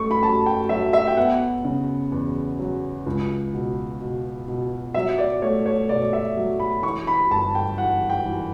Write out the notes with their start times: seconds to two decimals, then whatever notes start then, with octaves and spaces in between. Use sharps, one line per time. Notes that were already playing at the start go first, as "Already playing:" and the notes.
Already playing: F#2 A3 C#6
0.11 B5
0.23 F#2 A5
0.46 G5
0.69 F#3 E5
0.93 E5
1.07 G5
1.17 B3 F#5
1.64 C#3
2.12 E2
2.59 F#3
3.06 C#2
3.53 B2
4.00 B2
4.48 B2
4.94 F#3 E5
5.18 D5
5.42 A3 C#5
5.66 C#5
5.89 B2 D5
6.13 E5
6.37 F#3
6.60 B5
6.83 E3 C#6
7.07 B5
7.31 G1 A5
7.55 G5
7.78 E3 F#5
8.10 G5
8.25 E3